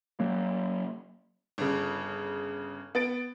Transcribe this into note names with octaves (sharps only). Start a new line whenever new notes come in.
F#3 A#3
G1 C#3
B3 A6 D7